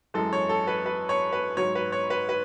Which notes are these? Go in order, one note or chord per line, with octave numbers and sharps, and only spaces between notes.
F#2 E3 G#3 A4
C#5
A4
B4
B4
C#5
B4
G#2 F#3 C#5
B4
C#5
B4
B4